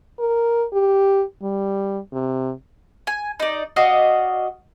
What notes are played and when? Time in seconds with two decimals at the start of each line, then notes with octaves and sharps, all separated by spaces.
0.19 A#4
0.73 G4
1.43 G3
2.13 C3
3.07 G#5
3.40 D#4 D5
3.76 F#4 D5 D#5 F5